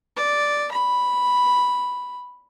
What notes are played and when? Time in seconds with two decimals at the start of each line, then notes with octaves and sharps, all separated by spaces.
0.17 D5
0.72 B5